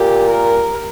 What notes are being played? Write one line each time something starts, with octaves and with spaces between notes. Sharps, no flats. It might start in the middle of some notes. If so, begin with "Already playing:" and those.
Already playing: A#2 G4
A#4